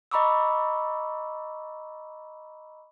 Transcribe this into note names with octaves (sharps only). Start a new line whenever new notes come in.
D#5 A#5 B5 C#6 D6 E6